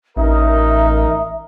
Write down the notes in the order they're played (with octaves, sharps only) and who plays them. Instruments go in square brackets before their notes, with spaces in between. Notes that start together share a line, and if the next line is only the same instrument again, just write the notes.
[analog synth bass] A1 [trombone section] D#4 A#4 [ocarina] E5